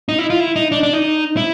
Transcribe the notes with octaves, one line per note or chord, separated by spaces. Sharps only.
D#4
E4
F4
E4
D#4
D4
D4
D#4
E4